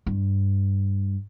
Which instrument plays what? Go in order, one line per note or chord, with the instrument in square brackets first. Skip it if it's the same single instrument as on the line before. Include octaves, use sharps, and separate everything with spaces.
[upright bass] G2